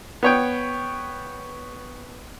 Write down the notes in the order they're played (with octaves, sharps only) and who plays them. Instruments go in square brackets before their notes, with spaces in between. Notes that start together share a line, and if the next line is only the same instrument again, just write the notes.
[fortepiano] B3 C#5 G5